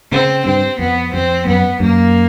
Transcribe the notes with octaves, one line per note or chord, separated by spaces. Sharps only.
C#3 C4
G2 C4
F2 B3
F2 C4
F#2 B3
F#2 A#3